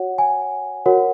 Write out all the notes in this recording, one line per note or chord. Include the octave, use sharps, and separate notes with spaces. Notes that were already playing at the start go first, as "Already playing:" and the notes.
Already playing: F#4 C#5 F#5
G#5
F#4 A#4 C#5 F#5